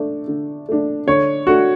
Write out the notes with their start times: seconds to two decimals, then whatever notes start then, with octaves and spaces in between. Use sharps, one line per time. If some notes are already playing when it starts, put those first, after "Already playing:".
Already playing: A3 D4
0.28 D3
0.69 A3 D4
1.07 D3 C#5
1.47 A3 D4 F#4